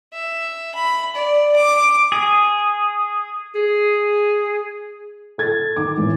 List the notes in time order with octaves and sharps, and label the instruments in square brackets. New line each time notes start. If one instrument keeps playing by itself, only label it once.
[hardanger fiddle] E5
B5
D5
D6
[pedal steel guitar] G#4
[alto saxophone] G#4
[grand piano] A4 G#6 A6
[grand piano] D#3 [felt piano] D6
[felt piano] A2 E3